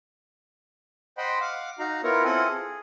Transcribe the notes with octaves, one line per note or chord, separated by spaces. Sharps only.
C5 D#5 F#5 G5 B5 C6
F5 F#5 D6
D#4 F#4 F5 A#5
B3 E4 F4 A#4 B4 C#5
C4 E4 F4 A4 F#5 G#5
G#4